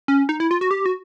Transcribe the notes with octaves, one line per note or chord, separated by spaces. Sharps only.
C#4
D#4
E4
F4
F#4
G4
F#4